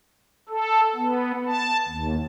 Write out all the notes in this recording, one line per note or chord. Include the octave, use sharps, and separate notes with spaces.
A4
B3
A5
D#2